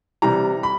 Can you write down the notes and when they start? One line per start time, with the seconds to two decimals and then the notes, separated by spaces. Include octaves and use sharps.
0.22 C3 E3 G3 A#5
0.63 B5